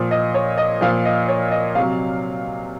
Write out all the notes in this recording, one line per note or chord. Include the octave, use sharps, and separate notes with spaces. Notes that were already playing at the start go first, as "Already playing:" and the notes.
Already playing: A#2 F3
D#5
C#5
D#5
A#2 F3 F5
D#5
C#5
D#5
C3 F#3 F5